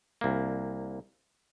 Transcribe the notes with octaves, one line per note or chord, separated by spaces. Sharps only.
C2 A#3